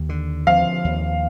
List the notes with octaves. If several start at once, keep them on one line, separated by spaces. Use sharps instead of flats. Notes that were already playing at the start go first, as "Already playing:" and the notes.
Already playing: D#2
D3
F3 F5
D#2